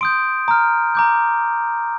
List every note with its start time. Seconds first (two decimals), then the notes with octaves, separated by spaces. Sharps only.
0.01 C6 D#6 G6 D7
0.48 A#5 F6
0.95 A#5 D6 G6